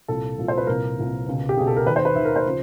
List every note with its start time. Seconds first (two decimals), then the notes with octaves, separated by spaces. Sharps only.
0.08 C2 A#2 F3 A4
0.38 C2 A#2 F3
0.48 C5
0.58 B4
0.67 C2 A#2 F3 A#4
0.97 C2 A#2 F3
1.27 C#2 B2
1.49 G4
1.57 C#2 B2 G#4
1.67 A4
1.77 A#4
1.86 D#2 B4
1.90 D#3
1.96 C5
2.05 B4
2.15 D#2 D#3 E5
2.25 A#4
2.36 C5
2.46 C#3 F3